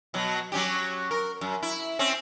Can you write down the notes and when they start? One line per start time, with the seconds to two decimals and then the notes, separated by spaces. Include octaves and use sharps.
0.14 B2 F#3
0.52 F#3 C#4 G4
1.11 A#4
1.41 F#2
1.62 E4
1.99 C4 C#4